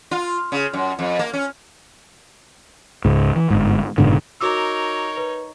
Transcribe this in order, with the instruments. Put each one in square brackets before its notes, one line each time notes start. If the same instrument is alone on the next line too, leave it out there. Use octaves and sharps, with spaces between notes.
[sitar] F4
C#3
F#2
F2
A#3
C#4
[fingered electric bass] C#2 G#2
E3
G1 G#2
F#1 G#2 B2 D3
[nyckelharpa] D#4 C#5 [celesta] F#4 D6 E6 [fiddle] A#4
[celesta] B4